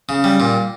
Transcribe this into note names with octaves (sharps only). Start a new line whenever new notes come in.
C#3
G3
A#2